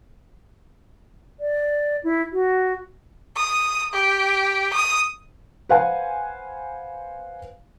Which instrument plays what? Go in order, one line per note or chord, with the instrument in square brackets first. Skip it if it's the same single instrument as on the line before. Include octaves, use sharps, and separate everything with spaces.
[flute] D5
E4
F#4
[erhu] D#6
G4
D#6
[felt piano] B4 C5 F5 F#5 G#5